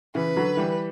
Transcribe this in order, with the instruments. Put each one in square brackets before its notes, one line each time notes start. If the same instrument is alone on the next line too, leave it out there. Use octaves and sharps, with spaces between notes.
[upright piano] C#3 E3 [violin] B4
[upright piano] D3 F#3
E3 G3